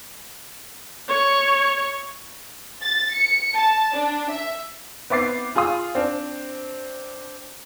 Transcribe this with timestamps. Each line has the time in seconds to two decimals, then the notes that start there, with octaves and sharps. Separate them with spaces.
1.09 C#5
2.82 A6
3.14 C#7
3.56 A5
3.93 D4
4.31 E5
5.10 B3 C4 E5 D6 A6 C7
5.55 F4 G#4 F5 C6 D#6
5.95 C4 D4